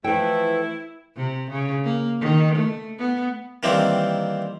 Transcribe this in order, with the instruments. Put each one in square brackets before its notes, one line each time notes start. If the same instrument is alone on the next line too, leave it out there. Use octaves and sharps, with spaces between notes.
[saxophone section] E3 F3 A3 [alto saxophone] E4 [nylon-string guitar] B4 G5
[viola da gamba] C3
C#3
A#3
D#3
A3
B3
[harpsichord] D#3 E3 G3 A#3 C4